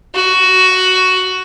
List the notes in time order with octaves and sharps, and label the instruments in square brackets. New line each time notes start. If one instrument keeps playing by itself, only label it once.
[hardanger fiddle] F#4